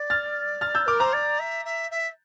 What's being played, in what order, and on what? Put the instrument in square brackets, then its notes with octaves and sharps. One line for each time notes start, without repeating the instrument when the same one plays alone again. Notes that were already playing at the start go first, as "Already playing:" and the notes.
Already playing: [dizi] D5
[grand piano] F6 A6
F6 A6
E6 G6
[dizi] A#4 [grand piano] D6 F6
[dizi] C5 [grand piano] A#5 D6
[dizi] D5
E5
E5
E5